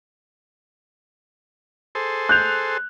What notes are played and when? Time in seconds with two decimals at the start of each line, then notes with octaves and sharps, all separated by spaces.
1.95 G#4 A4 C5
2.29 F#6 G6 F7